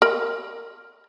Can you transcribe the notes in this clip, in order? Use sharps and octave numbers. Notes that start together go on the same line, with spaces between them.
A#4 B5